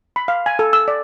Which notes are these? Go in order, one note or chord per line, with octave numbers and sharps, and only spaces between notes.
B5
F5
G#5
A4
E6
D5